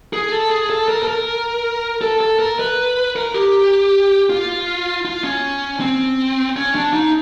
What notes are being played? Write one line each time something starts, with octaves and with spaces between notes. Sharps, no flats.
G#4
A4
G#4
A4
A#4
A4
A#4
A4
A4
A#4
B4
A#4
G4
F4
F4
C#4
C4
C#4
D4
D#4